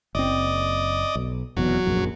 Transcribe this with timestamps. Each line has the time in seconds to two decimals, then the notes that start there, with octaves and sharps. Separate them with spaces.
0.15 F#1 C4 D5 D#5
1.15 B1
1.57 F1 E2 B2 F#3
1.86 F1 A#1 F#2